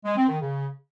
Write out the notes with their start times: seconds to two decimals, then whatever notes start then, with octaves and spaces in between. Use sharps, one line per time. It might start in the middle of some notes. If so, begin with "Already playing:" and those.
0.05 G#3
0.17 C4
0.29 D#3
0.40 C#3